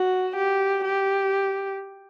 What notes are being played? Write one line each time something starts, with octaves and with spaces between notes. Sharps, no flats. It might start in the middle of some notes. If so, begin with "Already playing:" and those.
Already playing: F#4
G4
G4